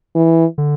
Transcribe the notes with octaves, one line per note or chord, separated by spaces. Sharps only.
E3
D3